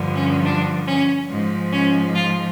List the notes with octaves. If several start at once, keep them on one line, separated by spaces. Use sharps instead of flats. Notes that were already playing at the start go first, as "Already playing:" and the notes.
Already playing: G2 D3 F3
C#4
D4
C#4
G#2 F3
C#4
F4